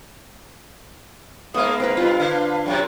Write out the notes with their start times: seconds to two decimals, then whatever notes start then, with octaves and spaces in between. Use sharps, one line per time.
1.54 G#2 A#3 B3 E5 F5 D#6
1.80 C4 A#4 B4
1.97 G2 C4 F4
2.20 D3 B4
2.66 F#2 C3 F#3 G5